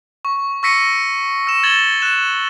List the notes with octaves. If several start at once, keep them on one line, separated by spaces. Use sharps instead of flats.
C#6
C#6 E6 A#6 B6 C#7 D#7
E6 E7
G#6 A6 E7 F#7 G7
F#6 E7